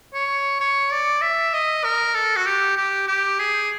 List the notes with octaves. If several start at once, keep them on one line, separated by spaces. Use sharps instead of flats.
C#5
C#5
D5
E5
D#5
A#4
A4
F#4
G4
G4
G4
G#4